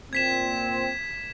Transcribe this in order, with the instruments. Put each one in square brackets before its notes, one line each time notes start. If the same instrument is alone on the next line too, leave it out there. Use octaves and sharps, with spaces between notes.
[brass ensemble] A#2 C4 [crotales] G#6 B6 E7